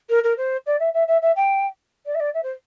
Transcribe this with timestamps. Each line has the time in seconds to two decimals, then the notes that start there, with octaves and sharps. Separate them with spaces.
0.10 A#4
0.24 A#4
0.37 C5
0.66 D5
0.79 E5
0.94 E5
1.07 E5
1.22 E5
1.36 G5
2.06 D5
2.14 E5
2.20 D5
2.34 E5
2.43 C5